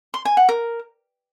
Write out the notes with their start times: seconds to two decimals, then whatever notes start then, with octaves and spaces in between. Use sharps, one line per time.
0.14 C6
0.25 G#5
0.37 F#5
0.49 A#4